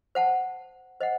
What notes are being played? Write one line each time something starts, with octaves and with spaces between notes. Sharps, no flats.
C5 F#5 A5
C5 D#5 F#5